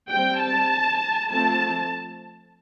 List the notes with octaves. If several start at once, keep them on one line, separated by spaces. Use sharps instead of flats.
G3 C4 G5
A5
F3 A3 C4 A5